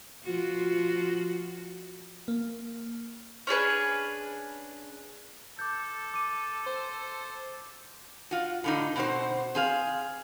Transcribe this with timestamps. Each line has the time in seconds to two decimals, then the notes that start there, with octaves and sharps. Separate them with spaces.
0.24 F3 F4 F#4
2.28 A#3
3.47 C#4 D4 G#4 B4
5.59 A4 D6 G6
6.14 D6 D#7
6.66 C5
8.31 F4 F#4
8.64 A2 D3 D#4
8.96 B2 C4 F#4 A#4 C5
9.55 C4 G#4 F5